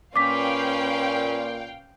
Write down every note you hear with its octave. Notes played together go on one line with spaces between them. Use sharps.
A#2 C#4 B4 F5 G5 D6 B6